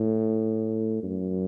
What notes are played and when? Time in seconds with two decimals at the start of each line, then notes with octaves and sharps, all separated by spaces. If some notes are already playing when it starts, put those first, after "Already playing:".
Already playing: A2
1.03 F#2